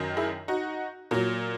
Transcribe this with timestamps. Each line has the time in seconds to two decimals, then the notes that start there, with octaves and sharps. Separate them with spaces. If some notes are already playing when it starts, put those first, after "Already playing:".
Already playing: F#2 D#3 F#3
0.17 E4 G#4
0.48 D#4 F#4
1.11 A#2 F#3